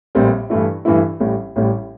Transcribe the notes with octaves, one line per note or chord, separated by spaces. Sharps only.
A#1 A2 G3 C4
G2 E3 A3 E4
G2 E3 A3 E4
A1 A2 G3
A1 A2 G3